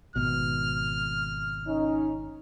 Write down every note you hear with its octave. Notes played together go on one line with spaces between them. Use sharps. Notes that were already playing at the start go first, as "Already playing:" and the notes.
G#1 B2 F6
C#4 D#4